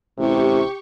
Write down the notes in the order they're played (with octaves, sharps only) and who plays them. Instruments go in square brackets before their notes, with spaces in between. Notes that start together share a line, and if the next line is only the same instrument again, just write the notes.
[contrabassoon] A1 [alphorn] C3 [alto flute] E4 [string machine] G4 C#6